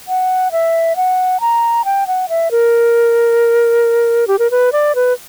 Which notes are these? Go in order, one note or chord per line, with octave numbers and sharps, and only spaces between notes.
F#5
E5
F#5
A#5
G5
F#5
E5
A#4
G4
A#4
B4
D5
B4